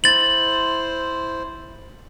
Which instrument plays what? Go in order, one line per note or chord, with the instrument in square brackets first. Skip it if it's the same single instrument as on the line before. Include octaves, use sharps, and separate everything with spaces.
[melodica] E4 C5 [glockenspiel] A6 F#7